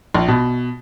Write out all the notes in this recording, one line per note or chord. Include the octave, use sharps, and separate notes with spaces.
A#1
B2